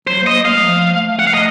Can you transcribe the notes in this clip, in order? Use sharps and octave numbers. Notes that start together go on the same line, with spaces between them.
F#3 C5
A#3
D#5
A#3
A3 F5
F3
A3
A3 F#5
F5
D#5